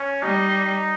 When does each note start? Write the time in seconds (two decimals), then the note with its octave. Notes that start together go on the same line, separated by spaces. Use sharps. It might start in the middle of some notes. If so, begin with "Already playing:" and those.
Already playing: C#4
0.22 G3 D#4